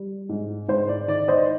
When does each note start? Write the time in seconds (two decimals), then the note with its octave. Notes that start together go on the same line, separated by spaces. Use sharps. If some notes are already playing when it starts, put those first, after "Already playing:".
Already playing: G3
0.29 G#2
0.68 G#2 C5
0.88 D5
1.08 D#3 D5
1.28 C5 D#5